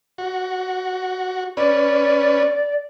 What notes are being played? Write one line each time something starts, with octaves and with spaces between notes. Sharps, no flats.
F#4
C#4 B4 D5